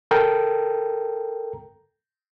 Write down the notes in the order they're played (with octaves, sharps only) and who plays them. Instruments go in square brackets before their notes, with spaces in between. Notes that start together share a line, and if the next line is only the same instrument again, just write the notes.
[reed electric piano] A4 A#4 G5 A#5